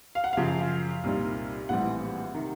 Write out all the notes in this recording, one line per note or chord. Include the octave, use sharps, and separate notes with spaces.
F5
F#5
F#2 C#3 F3 F5
C2 A#2 G3 C4 D#4
A#1 A2 E3 G3 C4 F#5
C3 D#3